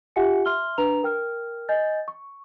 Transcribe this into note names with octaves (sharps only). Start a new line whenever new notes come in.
F4 G4 E5 F#5 G#5 C#7
E5 C6 F6 G7
D4 B4 A#5 F7
A#4 G5 F6
D#5 G#5 G6 A6
C#6